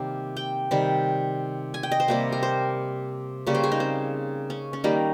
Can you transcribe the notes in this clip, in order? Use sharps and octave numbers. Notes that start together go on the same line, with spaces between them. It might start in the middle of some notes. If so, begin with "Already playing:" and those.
Already playing: C3 D#3 G3 A#3
G5
C3 D#3 G3
G#5
G5
D#5
C5
C3 G3 A#3
A#4
C5
C#3 G3 A#3 C#5
C5
G#4
D#4
C4
C#4
C#4
D#3 G3 A#3 D#4